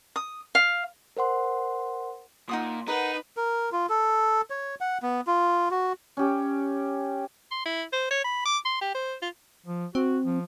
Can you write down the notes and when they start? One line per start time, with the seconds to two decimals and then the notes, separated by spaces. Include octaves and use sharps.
0.16 D#6
0.55 F5
1.17 A#4 C5 F#5 C6
2.49 A#2 D#4 F#5 D#6
2.88 D#4 A#4 B4 F#5
3.37 A#4
3.72 F4
3.89 A4
4.50 C#5
4.81 F#5
5.02 B3
5.27 F4
5.71 F#4
6.17 C#4 G4
7.52 C6
7.66 E4
7.93 C5
8.11 C#5
8.24 B5
8.46 D6
8.65 C6
8.81 G4
8.95 C5
9.22 F4
9.66 F3
9.95 C4 F#4
10.25 F3